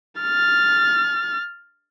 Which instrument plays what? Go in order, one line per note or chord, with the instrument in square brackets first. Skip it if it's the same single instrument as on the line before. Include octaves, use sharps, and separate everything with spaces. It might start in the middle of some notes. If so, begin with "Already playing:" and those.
[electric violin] F6 A6